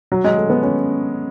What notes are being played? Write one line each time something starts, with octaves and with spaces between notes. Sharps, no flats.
F#3
G#3
A3
B3
C#4